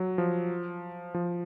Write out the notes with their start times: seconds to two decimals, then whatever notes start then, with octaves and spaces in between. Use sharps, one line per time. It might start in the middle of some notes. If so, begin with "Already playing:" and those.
Already playing: F#3
0.18 F3
1.14 F3